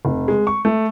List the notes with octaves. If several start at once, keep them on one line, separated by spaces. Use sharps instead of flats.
F1
G#3
C#6
A3